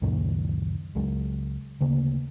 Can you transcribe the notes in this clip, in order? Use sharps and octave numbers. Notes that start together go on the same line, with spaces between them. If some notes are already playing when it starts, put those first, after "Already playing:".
C#2 F#2 A#2 D#3
C#2 F#3 G#3
D2 C#3 A#3